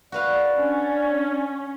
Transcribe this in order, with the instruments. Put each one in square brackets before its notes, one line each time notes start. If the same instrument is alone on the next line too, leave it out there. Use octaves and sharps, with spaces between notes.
[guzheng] F#4 B4 F5 [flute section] D5
[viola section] C#4 [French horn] D4